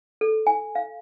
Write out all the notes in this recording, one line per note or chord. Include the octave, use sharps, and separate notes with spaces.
A4
G#5
F5